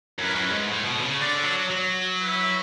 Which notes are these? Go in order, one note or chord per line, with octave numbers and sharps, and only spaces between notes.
F#2 C#4 E4 B4
F#2
G#2
A2
B2
D3
C#3
D3 D4 A4 D5
F#3
F#3
E4 B4 E5